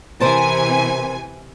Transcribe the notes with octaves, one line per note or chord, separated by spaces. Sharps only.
C3 E3 A#4 C5 G#5 A5